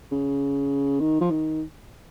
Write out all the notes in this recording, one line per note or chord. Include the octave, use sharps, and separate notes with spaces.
C#3
D#3
F3
D#3